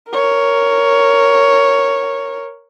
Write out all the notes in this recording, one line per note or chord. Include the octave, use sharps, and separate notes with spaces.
A#4 C#5